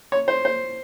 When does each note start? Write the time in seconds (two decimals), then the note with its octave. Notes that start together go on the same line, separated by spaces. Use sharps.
0.12 C#5
0.28 C5
0.45 C5